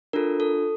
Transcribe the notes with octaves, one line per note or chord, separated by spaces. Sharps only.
D4 F4 A4 A#4
A4